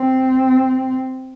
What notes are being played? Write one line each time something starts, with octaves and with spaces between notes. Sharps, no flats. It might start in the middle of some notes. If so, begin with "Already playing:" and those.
Already playing: C4